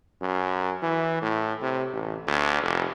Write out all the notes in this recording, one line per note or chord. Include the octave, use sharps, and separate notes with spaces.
F#2
E3
A2
C3
A1
D2
F1